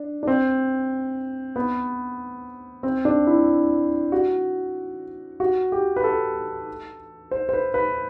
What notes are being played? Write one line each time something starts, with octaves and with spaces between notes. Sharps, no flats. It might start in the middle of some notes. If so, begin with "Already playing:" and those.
Already playing: D4
D4
C4
B3
C4
D4
E4
F#4
F#4
G4
B4
A4
C5
C5
B4
B4